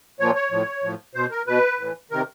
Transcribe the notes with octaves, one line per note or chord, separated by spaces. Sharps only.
A#2 F3 C#5
C#5
A2 F3
A2 F3
B2 C5
A#4
B2 B4
A2 E3
C3 D#3 A#4